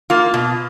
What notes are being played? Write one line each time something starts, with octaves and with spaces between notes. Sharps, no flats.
A#3 F4
B2